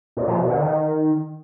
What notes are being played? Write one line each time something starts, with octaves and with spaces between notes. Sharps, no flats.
A#2
F3
B2
D3
D#3